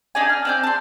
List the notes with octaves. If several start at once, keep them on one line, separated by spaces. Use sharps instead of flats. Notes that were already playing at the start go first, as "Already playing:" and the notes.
D4 D#4 D5 G#5
F6
C4 D5 G6
A5 C6